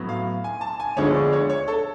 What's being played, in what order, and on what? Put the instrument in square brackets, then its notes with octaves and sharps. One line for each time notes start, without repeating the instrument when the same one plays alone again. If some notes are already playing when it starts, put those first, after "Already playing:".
Already playing: [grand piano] A2 F#3 B3
F5
G#5
A5
G#5
D2 D3 F3 G#3 B3 C#5
D5
C#5
C#5
A4